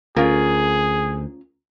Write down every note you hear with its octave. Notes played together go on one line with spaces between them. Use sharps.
D2 C#4 F4 G#4 A#4